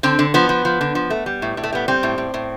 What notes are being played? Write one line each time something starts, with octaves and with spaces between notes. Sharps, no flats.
D3 C4
D3
F3 B3
F3
F3
D3
F3
A3
G3
A2
A2
A3
G3 B3
G3 C4
A2
A2
A2